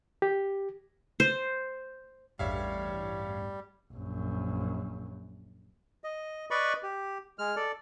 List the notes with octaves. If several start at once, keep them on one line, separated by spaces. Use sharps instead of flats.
G4
C5
A1 E2 G2 G3 C#5 E5 F5
A#1 F#2
D#5
B4 D5 D#5 B5 C#6
G4
G#3 F6
A4 D5